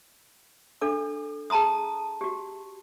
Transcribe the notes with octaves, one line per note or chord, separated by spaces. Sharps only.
D4 A4 D6
G#4 A5 A#5 C6 D#6
F#4 G4